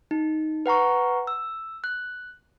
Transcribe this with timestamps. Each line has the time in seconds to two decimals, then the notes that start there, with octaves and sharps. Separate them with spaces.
0.11 D#4
0.66 B4 F#5 A#5 C#6
1.27 E6
1.84 F#6